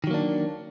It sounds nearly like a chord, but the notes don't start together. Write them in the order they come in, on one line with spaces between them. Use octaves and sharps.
D#3 F#3 A#3 D4